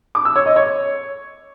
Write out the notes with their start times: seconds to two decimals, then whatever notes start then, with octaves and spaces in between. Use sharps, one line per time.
0.15 D6
0.25 E6
0.36 C#5
0.46 D#5
0.56 C#5